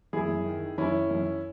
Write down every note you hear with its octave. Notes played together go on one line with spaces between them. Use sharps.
F#2 E4 G#4
F#2
D#3
D#3
F#2 C#4 E4
D#3
F#2